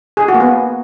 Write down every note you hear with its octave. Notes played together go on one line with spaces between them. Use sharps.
G#4
F#4
A#3
B3